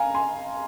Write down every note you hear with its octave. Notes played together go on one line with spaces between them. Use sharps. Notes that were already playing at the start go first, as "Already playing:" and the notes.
Already playing: F5 G#5 A#5
G#5 C6